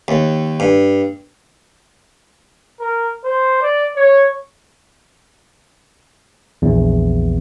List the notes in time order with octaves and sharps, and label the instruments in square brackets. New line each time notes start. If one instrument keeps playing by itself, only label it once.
[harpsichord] D#2
G2
[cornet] A#4
C5
D5
C#5
[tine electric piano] A#1 E2